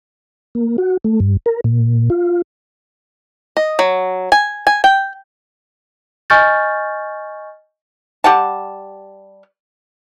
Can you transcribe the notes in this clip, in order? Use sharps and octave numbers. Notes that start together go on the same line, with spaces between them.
A#3
F#4
A3
G2
A#4
A#2
F4
D#5
F#3
G#5
G#5
G5
D#5 G#5 C#6 F6 G6 A6
G3 G4 F#5 A5